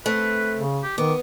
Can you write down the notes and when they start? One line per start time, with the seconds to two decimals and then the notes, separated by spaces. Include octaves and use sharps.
0.06 A3 C4 B4
0.57 C#3
0.83 G4
0.98 D#3 B3 D6